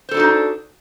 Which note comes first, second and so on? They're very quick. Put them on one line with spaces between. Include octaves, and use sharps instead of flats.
C5 A4 D4 F#4 D#4